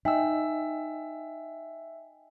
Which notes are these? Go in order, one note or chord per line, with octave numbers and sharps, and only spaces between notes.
D#4 D#5 E5 G5 G#5 E6